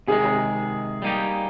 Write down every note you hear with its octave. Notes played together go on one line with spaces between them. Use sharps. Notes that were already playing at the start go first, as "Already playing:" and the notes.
C3 D#3 G#3 G#4
G3 A#3 D#4 G4